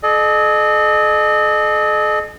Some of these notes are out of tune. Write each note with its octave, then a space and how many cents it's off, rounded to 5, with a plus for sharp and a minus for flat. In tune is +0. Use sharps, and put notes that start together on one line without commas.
A4 -45 D#5 -35